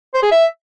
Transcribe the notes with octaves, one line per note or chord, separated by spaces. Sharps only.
C5
G#4
E5